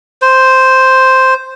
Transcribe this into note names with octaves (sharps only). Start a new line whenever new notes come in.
C5